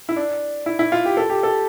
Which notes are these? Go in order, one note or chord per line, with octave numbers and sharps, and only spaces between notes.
E4
D4
E4
E4
F4
G4
A4
G4
A4